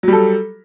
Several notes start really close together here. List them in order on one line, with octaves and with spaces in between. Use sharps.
F#3 G3 A4